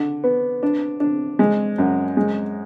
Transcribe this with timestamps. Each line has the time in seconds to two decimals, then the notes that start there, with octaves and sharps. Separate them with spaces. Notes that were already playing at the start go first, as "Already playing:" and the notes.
Already playing: D3
0.24 B3
0.63 D4
1.00 D4
1.39 G#3
1.78 F#2
2.17 G#3